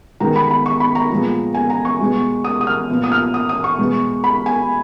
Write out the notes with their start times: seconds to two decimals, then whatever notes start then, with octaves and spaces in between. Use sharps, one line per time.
0.20 D#3 G#3 B3 A#5
0.36 B5
0.51 B5
0.66 C#6
0.80 B5
0.95 A#5
1.10 A#2 F3 G#3 B3
1.55 G#5
1.70 A#5
1.85 C#6
2.00 B2 G#3 B3
2.44 D#6
2.61 D#6
2.67 F6
2.89 A#2 F3 B3
3.04 D#6
3.12 F6
3.34 D#6
3.49 D#6
3.64 C#6
3.78 B2 G#3 B3
4.24 B5
4.46 G#5